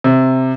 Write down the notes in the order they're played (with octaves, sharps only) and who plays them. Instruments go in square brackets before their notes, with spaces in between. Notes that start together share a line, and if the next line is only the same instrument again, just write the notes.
[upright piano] C3